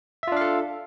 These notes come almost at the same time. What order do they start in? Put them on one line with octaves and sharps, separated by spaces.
E5 F4 D4 F5 A4